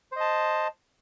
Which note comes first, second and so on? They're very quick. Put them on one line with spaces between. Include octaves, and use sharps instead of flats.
C5 D#5 A5